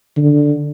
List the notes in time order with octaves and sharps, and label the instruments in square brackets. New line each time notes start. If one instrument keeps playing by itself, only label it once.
[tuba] D3